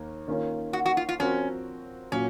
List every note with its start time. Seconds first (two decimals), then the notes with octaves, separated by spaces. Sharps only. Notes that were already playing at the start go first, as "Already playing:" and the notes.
Already playing: D#2 D#3 A#3
0.28 D#3 A#3 C#4 F4
0.73 F#4
0.86 F#4
0.97 F4
1.09 F4
1.20 F3 C4 C#4 F#4 A#4
2.12 A#2 F#3 C#4